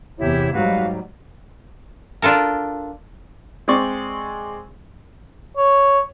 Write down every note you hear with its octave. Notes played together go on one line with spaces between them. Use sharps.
E2 C3 E4 G4 C#5
G#2 F#3 G3 F#4 B4 F5
D4 F4 A4 A#4
G#3 C4 G#4 D5 C#6
C#5